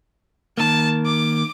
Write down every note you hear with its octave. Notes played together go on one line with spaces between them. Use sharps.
D#3 A#3 A5
D6